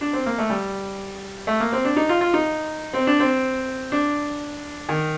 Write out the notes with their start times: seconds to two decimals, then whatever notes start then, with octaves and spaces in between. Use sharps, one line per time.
0.01 D4
0.13 C4
0.26 A#3
0.38 A3
0.50 G3
1.47 A3
1.60 A#3
1.72 C4
1.85 D4
1.96 D#4
2.09 F4
2.21 F4
2.34 D#4
2.93 C4
3.07 D4
3.20 C4
3.92 D4
4.89 D#3